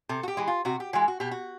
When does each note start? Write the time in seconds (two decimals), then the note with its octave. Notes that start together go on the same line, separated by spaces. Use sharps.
0.09 C3 A4
0.23 F#4
0.28 G4
0.37 E3 G#3
0.48 F4
0.65 C3 F#4
0.80 G4
0.93 E3 G#3 F#4
1.08 F#4
1.20 B2 G4
1.31 F#4